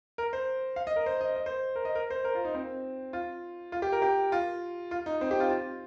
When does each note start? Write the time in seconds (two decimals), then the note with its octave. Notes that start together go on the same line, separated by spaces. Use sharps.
0.18 A#4
0.33 C5
0.76 F5
0.87 D#5
0.96 A#4
1.06 C5
1.21 D#5
1.36 D#5
1.46 C5
1.76 A#4
1.85 D#5
1.95 A#4
2.10 C5
2.25 A#4
2.35 F4
2.45 D#4
2.55 C4
3.13 F4
3.72 F4
3.82 G4
3.92 A#4
4.02 G4
4.32 F4
4.91 F4
5.06 D#4
5.21 C4
5.31 G4
5.40 F4
5.50 F4